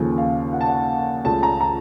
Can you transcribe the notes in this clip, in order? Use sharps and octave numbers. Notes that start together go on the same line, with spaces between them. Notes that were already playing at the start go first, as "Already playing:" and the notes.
Already playing: D#2 C#3 F3 A#3 A4
F5
F#5
A5
F#5
C#2 C#3 A3 C#4 A5
A#5
A#5